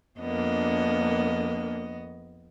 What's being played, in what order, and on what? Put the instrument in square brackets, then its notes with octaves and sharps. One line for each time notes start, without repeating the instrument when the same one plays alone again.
[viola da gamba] F2 B3 D#5 [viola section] A#3 D4